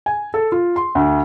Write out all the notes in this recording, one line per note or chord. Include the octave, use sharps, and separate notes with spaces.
G#5
A4
F4
C6
D2